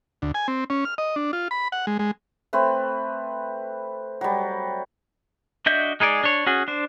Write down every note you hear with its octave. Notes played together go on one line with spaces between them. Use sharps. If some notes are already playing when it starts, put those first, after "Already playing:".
D2
G#5
C4
C#4
F6
D#5
D4
F4
B5
F#5
G#3
G#3
A3 C4 B4
F#3 G3
D4 F#4 D#5 E5 G6
G#3 D#4 G#4 D5
D4 C#5
C#4 F#4 G#4
D4 C5